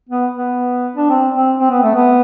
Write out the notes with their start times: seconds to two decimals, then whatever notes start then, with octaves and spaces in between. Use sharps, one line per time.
0.09 B3
0.35 B3
0.96 D4
1.10 C4
1.35 C4
1.60 C4
1.71 B3
1.83 A3
1.95 B3